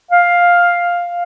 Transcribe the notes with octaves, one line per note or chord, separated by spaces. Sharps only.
F5